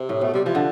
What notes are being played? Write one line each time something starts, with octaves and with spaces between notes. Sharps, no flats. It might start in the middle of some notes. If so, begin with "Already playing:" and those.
Already playing: C3
A2
B2 A3
C3 G3
E3 F3
D3